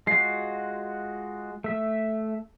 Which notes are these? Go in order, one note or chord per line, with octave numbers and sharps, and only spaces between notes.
G#3 F4 F#4 C7
A3 E5